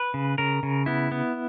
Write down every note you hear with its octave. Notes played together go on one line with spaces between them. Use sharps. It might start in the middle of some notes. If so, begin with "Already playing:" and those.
Already playing: B4
C#3
C#3 A#4
C#3
B3 E4
B3